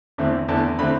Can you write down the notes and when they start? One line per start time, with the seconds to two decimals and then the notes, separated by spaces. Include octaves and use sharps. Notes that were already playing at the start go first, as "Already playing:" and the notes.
0.18 E2 D3 A3 C4
0.48 E2 D3 A3 C4 A5
0.79 D3 A3 C4 B5